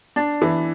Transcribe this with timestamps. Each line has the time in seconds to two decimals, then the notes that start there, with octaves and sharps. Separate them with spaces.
0.16 D4
0.42 E3